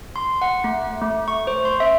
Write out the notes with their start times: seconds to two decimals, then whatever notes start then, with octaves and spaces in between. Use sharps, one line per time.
0.16 C6
0.42 F#5
0.64 A3
1.01 A3
1.28 C#6
1.47 C5
1.65 C6
1.80 E5